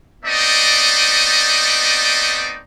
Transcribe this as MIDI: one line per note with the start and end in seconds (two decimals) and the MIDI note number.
0.24 2.60 57
0.24 2.60 59
0.24 2.60 60
0.24 2.60 63
0.24 2.60 74
0.24 2.60 75